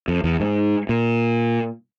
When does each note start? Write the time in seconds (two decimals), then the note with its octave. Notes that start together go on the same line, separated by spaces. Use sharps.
0.08 F2
0.24 E2
0.40 G#2
0.89 A#2